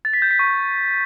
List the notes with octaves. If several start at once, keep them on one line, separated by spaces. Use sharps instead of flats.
A6
B6
G6
B6
C#6